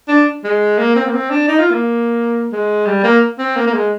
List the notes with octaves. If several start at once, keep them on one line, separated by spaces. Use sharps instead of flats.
D4
G#3
A#3
C4
A#3
C4
D4
D#4
F4
A#3
G#3
G3
A#3
C4
A#3
A#3
G#3